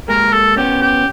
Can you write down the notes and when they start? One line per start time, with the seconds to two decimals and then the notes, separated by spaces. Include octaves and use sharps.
0.08 G#3 A#3 A#4
0.33 A4
0.57 B3 C#4 G4
0.82 G4